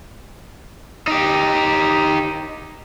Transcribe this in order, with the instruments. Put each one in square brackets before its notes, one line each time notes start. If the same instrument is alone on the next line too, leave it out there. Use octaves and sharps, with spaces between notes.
[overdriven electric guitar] D#4 G4